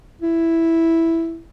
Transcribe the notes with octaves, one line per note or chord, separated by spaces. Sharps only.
E4